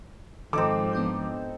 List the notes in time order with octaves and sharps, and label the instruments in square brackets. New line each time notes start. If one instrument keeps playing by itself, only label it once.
[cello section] G#2 F3 [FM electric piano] D#3 [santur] C4 D#4 A4 [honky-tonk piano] D6
[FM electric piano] B3 D4 G6